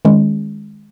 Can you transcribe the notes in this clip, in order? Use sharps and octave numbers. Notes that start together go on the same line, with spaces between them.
D#3 G#3 C#4